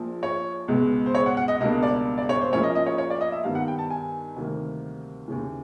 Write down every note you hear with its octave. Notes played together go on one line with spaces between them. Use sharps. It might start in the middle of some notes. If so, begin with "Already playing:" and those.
Already playing: A#1 A#2 F3
C#5
C#2 B2 G#3 B3
C5
C#5
F#5
F#5
D#5
C#2 B2 G3 A#3 D4 D#5
D5
D5
C#5
C5
A#2 F3 A#3 C#4 E4 C#5
D#5
D#5
C#5
C#5
D5
D#5
E5
G2 D#3 G3 B3 D#4 F5
F#5
G5
A5
G#5
D2 C3 D#3 G3 A#3
D#2 C#3 E3